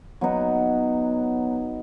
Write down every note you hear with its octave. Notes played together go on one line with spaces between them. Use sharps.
F#3 B3 D#4